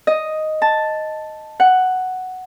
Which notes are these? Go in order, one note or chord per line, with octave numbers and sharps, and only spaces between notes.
D#5
A5
F#5